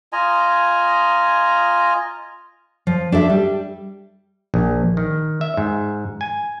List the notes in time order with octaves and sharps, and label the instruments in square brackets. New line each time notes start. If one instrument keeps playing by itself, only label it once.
[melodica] F4 D#5 G#5 A#5
[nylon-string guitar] F3
D4 A4 E5
G3
[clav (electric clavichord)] A#1
D#3
E5
G#2
G#5